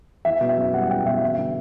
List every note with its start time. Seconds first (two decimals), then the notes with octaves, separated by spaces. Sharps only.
0.25 E2 E5
0.41 B2
0.49 E5
0.57 F#1
0.74 G3 F#5
0.90 E2 G5
1.06 B2 E5
1.22 G2 E5
1.38 D3